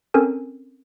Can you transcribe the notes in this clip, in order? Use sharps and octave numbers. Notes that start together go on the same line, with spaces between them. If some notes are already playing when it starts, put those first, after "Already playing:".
C4 C#4 A4 A#4 G#5